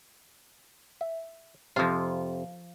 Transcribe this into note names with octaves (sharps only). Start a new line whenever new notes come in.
E5
F2 C3 F3 F4